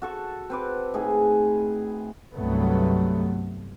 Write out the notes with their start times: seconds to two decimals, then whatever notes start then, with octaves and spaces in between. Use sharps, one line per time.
0.02 F#4 A4 C#6
0.50 C4 B4 D6
0.94 A2 D#4 G#4
2.35 C2 G2 F#3 A3 B3